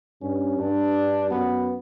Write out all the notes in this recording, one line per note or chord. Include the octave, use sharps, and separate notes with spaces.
G2 C#4
G2 D4
F#2 B3